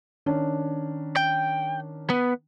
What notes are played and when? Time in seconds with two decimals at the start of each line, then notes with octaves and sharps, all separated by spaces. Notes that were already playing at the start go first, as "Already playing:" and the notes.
0.26 D#3 C#4 D4
1.16 G5
2.10 B3